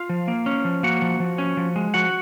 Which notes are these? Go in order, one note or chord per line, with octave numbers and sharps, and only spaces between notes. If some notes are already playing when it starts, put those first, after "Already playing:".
Already playing: F4 F5
F3
A#3
C#4
F3
A#3 F#4 F#5
F3
F3
C#4
F3
G#3
F3 F#4 F#5